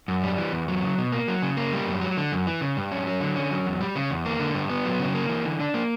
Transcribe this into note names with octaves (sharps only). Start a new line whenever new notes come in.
F#2
G3
E3
E2
F#3
C#3
B2
A#3
F#3
C#3
A#3
G3
F#2
F#3
D3
F#2
E3
C#3
G2
C#4
F#3
D3
C#4
F#3
E2
G3
C#3
E2
A#3
D3
G2
B3
F#3
C#3
A#3
E3
D3
D4
A#3